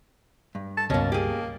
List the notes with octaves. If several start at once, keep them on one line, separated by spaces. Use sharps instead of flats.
G2
A5
C#2 G2 B2 A#3 C#4
A#3 G4 G#4